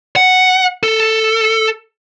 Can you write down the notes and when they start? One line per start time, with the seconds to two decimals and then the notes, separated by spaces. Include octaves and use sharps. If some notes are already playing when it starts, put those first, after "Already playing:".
0.16 F#5
0.83 A4